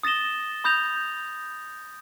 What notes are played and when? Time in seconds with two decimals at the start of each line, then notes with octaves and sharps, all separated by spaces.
0.03 D#6 A6 A#6 E7 G7
0.64 B5 D#6 G6 A#6 F7